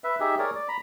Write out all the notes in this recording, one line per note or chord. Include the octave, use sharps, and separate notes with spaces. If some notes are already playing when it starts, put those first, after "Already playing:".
B4 E5
D#4 G4 G#4 E5
G#4 A#4 C#5 D5
D5
A#5 B5